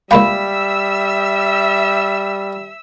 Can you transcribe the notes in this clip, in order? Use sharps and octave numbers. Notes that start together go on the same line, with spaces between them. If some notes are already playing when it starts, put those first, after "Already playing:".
C#2 G3 A#3 E5 F5 G5 B5 E6